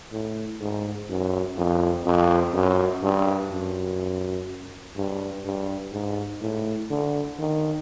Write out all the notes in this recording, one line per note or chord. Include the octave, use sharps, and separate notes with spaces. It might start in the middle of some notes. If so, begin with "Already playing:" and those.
A2
G#2
F#2
F2
F2
F#2
G2
F#2
G2
G2
G#2
A2
D3
D#3